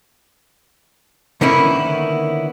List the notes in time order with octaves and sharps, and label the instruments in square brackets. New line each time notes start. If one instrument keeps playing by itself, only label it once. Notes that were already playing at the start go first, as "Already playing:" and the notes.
[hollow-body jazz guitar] D3 D#3 A#3 B3 C#4 E4